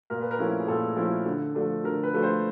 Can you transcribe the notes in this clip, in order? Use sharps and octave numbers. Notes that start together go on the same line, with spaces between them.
A#2 A#4
B4
A#4
F3 A3 C#4 E4
G#4
A#2 A4
F3 A3 C#4 E4
D3
F3 A3 D4
D3 A#4
B4
F3 A3 D4
C5